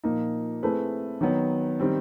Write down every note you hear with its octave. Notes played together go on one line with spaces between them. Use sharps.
A#2 F3 A#3 D#4
A3 C4 E4 G#4 B4
D#3 F#3 B3
D#3 G3 C4